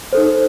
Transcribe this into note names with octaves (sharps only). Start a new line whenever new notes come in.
D#4 A4 C5